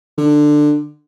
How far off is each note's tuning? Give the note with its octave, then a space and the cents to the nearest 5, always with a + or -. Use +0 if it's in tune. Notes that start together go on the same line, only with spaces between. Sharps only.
D3 +15